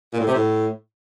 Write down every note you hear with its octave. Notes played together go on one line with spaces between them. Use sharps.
A#2
A2
C3
A2